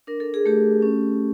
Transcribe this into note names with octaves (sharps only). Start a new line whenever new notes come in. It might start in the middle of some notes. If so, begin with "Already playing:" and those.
D4 A#4
A4
G#4
A3 G4 A4
C#4